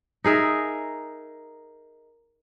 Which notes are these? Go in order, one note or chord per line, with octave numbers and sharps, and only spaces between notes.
D#4 G#4 A#4 E5